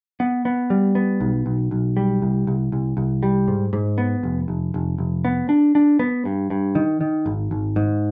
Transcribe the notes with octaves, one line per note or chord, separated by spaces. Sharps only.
B3
B3
G3
B3
B1
B1
B1
G3
C2
C2
C2
C2
G3
G#2
G#2
B3
F1
F1
F1
F1
B3
D4
D4
B3
G2
G2
D#3
D#3
G#1
G#1
G#2